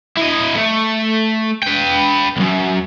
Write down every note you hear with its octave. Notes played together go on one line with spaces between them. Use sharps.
E4 D#5
A3
B4 G5
B1 F#2